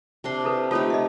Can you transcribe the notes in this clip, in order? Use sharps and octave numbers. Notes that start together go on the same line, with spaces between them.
C3 D4 C6
E4 A4 B4
A3 D#4 F4 G4 A4 C#5
D#5 E5